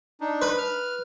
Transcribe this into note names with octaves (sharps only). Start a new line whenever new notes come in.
D4 D#4
B4
F6